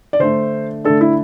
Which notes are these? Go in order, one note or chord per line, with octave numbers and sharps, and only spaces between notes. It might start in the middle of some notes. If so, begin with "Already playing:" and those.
D5
D3 A3 D4 C5
D3 A3 D4 A4
E4